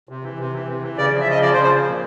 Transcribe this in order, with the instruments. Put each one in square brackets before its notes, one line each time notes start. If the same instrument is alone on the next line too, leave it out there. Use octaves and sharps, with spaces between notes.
[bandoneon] C3
E3
C3
E3
C3
E3
C#3 D5
F3
E5
C#3 D#5
F3 D5
C5
C#3
C5
F3
A#2